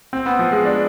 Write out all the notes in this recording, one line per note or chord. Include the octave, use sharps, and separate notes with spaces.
C4
B3
F3
G#3
D4